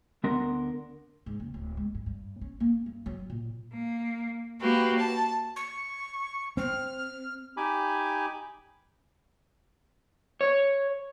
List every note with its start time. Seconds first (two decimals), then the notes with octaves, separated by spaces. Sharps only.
0.24 D2 B3 D4 A#4 F#5 C6
1.26 G#2
1.40 F#1
1.54 D1
1.77 G#3
1.95 G2
2.06 G2
2.41 C#4
2.60 A#3
2.86 G2
3.06 F#3
3.30 A#2
3.72 A#3
4.61 A#3 F#4 G4 B4
4.99 A5
5.56 C#6
6.57 C4 F6
7.57 D#4 G4 G#5 B5 D6
10.41 C#5